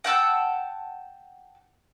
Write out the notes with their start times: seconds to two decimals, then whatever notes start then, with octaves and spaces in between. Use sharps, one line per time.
0.04 F#5 G5 A5 E6